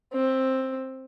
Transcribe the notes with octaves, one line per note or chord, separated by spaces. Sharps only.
C4